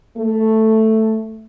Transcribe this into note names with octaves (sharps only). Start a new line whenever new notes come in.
A3